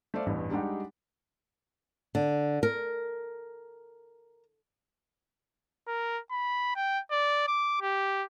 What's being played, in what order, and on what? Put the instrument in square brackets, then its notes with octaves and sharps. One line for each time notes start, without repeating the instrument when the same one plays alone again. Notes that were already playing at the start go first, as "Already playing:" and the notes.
[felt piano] A3 C5 D5 F5
A1 E2 G2
G3 G#3 D4 D#4 G4 F#5
[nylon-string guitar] D3
A#4
[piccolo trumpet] A#4
B5
G5
D5
D6
G4